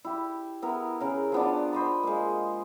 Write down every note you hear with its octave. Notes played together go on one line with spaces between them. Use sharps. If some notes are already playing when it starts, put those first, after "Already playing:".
E4 G4
B3 E4 A#4
C#3 A#4
F3 B3 D4
C5 D#5 B5
G#3 A#3